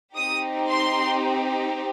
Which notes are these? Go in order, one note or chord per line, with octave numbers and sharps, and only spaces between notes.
C4 D#4 G4 D#6
C6